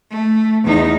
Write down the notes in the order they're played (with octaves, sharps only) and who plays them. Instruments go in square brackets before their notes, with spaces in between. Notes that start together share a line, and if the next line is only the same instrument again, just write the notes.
[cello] A3
E2 D#4